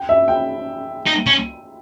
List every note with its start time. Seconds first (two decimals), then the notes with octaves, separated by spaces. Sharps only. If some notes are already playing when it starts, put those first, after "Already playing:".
Already playing: G5
0.09 E5
0.28 G5
1.06 D#4
1.27 C#4